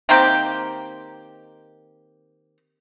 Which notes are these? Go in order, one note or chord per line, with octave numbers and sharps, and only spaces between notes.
D#3 A#3 C4 G4